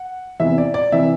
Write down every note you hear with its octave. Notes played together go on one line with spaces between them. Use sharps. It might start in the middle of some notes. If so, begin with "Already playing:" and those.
Already playing: F#5
E2 C3 E3 E5
D5
D5
C3 E3 E5